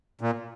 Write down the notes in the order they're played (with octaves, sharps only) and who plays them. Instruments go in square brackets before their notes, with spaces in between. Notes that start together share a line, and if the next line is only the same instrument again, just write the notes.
[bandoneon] A#2